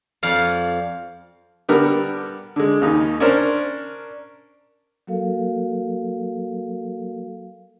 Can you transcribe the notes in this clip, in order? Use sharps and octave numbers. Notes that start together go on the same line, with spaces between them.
F2 D5 F5
D3 G3 B3 A#4
D3 G#3
D#2 C#3 D#4
C#4 D4 A#4 C5
F#3 A#3 F#4 A4 A#4 F5